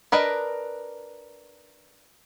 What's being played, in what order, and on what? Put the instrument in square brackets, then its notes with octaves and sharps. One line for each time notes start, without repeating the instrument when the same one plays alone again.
[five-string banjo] D4 A#4 B4 D#5